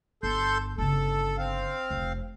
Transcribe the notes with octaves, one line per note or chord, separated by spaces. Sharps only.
G1 A4 C6 G6
G1 C#3 A4
C4 F5
F1